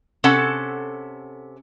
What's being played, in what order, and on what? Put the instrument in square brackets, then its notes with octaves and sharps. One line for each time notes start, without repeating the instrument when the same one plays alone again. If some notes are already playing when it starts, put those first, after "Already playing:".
[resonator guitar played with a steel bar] C3 C#4 A4 F#5 A5